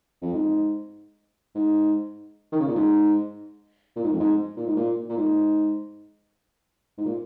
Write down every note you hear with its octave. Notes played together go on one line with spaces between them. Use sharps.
F2
G#2
G#2
D#3
C#3
A#2
G#2
A#2
G#2
F2
G#2
A#2
G#2
A#2
A#2
G#2
G#2
A#2